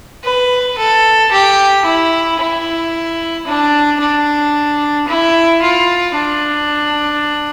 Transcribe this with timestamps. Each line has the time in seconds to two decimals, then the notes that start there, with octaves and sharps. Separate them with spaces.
0.24 B4
0.78 A4
1.31 G4
1.85 E4
2.39 E4
3.47 D4
4.00 D4
5.08 E4
5.62 F4
6.15 D4